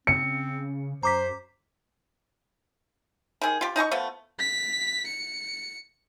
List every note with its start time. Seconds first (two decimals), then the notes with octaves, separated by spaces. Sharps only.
0.07 C#3 C4 C#7
1.03 F#2 C5 A#5 D6 B6
3.41 D#3 G#4
3.61 F4 G4
3.76 D#4 D#5 A5 C#6
3.91 F3 A3 B3
4.39 B6
5.07 C#7